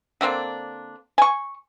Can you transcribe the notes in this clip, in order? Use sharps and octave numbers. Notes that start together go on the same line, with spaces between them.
D3 A#3 C4 D4
G#5 C#6